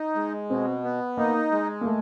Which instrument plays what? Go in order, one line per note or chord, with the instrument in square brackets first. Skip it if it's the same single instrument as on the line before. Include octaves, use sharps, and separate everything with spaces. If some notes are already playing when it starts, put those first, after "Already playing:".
Already playing: [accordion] D#4
G#3
[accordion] B2 [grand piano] C4
[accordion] B3
[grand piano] A#3 [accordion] D#4
[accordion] G#3
[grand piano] A#3
A3